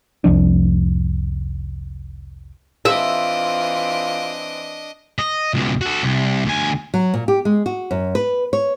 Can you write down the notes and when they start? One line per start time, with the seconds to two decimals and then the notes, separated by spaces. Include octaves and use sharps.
0.24 F1 C2 F3 D4
2.85 E3 C4 D4 F4 D#5 E5
5.19 D#5
5.54 C#2 B2
5.81 F#4 A4
6.03 C2
6.45 D2 G#5
6.94 F#3
7.14 A#2
7.28 G4
7.45 G#3
7.66 F#4
7.91 F#2
8.15 B4
8.53 C#5